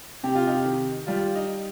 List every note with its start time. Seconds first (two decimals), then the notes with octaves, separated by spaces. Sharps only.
0.23 C3 G4
0.35 F4
0.47 D#4 G4
0.65 D#3
1.07 G3 F4
1.35 D#4